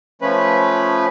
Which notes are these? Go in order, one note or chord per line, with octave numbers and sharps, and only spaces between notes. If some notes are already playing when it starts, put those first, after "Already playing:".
F3 A3 C#4 B4